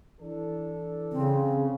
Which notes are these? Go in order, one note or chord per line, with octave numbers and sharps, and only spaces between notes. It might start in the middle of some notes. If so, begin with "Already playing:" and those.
E3 D4 A4
C#3 C4